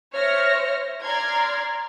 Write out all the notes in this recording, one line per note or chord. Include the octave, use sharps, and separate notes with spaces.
C5 C#5 E5 F6 A#6 C#7
D5 A#5 C6 F6 G#6